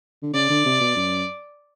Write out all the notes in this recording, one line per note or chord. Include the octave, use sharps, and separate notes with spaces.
D3
C#3 D5
D3
C3
B2
F#2